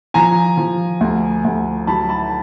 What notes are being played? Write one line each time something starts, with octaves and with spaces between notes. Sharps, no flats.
F3 G#5 A#5
F3
D2
D2
F#3 A5 B5
A5 B5